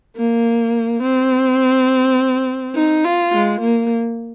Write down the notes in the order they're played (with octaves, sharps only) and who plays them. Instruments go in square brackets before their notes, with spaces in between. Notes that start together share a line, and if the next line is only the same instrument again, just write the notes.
[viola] A#3
C4
D#4
F4
G#3
A#3